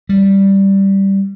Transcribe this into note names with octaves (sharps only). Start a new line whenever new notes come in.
G3